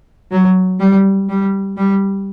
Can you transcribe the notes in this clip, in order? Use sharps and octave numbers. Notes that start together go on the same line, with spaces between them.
F#3
G3
G3
G3